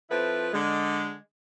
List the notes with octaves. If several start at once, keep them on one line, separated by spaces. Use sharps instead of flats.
F3 C4 E4 A4 B4
D3 G#3